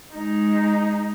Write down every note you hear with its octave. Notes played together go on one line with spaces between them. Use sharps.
G#3 D#4